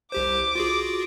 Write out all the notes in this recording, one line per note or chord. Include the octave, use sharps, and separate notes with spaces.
C2 G4 C5 D6
F4 F#4 G#4